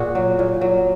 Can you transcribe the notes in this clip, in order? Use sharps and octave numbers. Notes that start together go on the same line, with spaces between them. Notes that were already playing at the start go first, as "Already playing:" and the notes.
Already playing: A#2 F#4 G#4
F#3
A#2
F#3